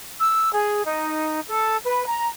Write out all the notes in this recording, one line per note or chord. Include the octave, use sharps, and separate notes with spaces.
E6
G#4
D#4
A4
B4
A#5